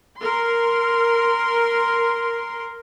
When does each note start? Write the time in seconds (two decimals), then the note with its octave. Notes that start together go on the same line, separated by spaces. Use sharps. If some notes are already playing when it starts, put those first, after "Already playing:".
0.20 A#4 C6